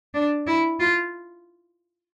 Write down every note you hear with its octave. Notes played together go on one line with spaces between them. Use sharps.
D4
E4
F4